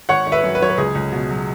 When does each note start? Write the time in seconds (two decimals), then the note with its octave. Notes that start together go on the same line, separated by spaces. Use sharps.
0.09 G#1 C#5 F#5
0.27 G#1
0.32 B4 E5
0.44 F#2
0.55 B4
0.61 F#3 C#5
0.69 B4
0.78 C#2 G#4
0.95 C#2
1.12 B2
1.30 F#3